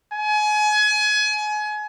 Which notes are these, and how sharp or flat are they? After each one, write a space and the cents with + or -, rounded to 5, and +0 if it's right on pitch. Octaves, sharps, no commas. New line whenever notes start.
G#5 +30